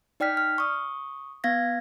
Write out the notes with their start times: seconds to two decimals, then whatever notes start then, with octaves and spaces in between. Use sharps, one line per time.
0.20 D#4 D5 G5 F6 B6
0.37 F6
0.58 C#6 D#6
1.44 B3 F5 G#6 A#6